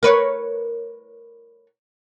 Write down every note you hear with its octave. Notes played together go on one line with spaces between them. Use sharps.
A#4 B4 C#5